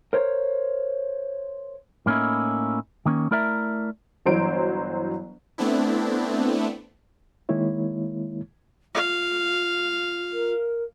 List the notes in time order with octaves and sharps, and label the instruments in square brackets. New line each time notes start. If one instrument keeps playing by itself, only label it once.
[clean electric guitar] A#4 C5 C#5
A2 A#3 C#4 D#4 E4
D#3 A#3 C#4
A3 E4 A#4 D5 E5 A#5
[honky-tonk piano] G1 E3 F#3 C5 C#5 D7
[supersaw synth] A3 B3 C4 D4 E4
[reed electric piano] D#3 G#3 A#3 E4 C#5
[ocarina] F4 [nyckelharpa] F5
[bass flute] A#4